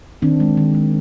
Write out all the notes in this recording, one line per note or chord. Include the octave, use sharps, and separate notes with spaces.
D#3 C4 D4
G#3
D#3
G#3